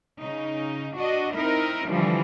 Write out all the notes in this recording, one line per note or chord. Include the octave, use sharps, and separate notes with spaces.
C#3 D#4
D4 F#4 D#5
C4 D#4 E4 A#4
D3 E3 F3 G3